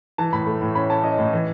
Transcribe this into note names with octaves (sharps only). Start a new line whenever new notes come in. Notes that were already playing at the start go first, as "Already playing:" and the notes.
E3 A5
A2 B5
A3
A2
C#4 B5
C#4 A5
C#4 D#5
A2
E3